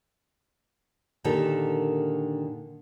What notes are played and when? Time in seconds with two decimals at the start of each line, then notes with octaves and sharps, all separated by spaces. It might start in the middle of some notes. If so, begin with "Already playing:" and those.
1.24 A#2 D3 D#3 G4 A4